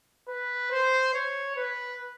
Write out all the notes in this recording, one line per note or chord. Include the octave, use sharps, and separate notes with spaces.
B4
C5
C#5
B4